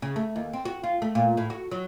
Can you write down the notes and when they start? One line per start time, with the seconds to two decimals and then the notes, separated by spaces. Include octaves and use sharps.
0.02 C#3
0.16 A3
0.36 D#2
0.53 C4
0.65 F#4
0.84 F4
1.02 A3
1.15 A#2
1.37 A2
1.50 F#4
1.71 F#3